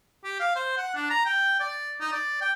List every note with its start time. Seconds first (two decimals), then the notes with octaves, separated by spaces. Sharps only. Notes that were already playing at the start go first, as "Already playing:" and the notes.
0.24 G4
0.40 F5
0.56 C5
0.78 F#5
0.95 D4
1.10 A#5
1.26 G5
1.60 D5
2.00 D#4
2.12 D5
2.42 G5